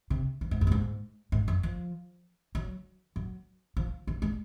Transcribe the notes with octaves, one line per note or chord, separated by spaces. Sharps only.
C3
F3
G#2
F#2
A#2
G#2
G#2
F#2
F3
F#3
F#3
F3
F#3
G#3